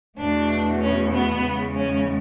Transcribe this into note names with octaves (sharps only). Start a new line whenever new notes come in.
E2 B2 A3 D4
C#4
B3
E2 C#3 G#3
C#4